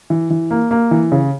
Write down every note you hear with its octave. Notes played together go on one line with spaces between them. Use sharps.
E3
E3
A#3
A#3
E3
C#3